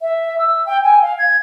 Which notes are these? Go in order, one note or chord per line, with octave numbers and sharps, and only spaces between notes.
E5
E6
G5
G#5
F5
G#6